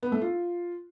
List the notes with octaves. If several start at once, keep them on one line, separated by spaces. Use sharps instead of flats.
B3
A3
F4